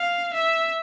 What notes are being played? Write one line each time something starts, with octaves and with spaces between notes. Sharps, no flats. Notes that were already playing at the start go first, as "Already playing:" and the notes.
Already playing: F5
E5